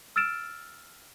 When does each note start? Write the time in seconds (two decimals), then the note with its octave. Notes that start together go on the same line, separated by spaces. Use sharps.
0.16 E6 F6 A6 D7 E7